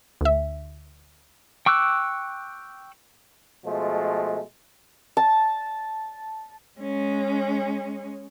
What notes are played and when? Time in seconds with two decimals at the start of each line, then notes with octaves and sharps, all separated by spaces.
0.21 D2 E5
1.66 G5 C#6 D6 E6 F#6
3.65 B2 F3 G#3 A3
5.17 A5
6.80 G#3 C#4